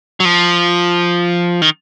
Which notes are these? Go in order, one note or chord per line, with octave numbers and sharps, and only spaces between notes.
F#3
F3
D#3